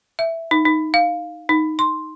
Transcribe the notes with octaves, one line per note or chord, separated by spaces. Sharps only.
E5
D#4
D#4
F5
D#4
C6